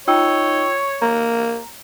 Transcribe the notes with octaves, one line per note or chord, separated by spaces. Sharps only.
D#4 F4 C#5 G5 E6
A#3 A#5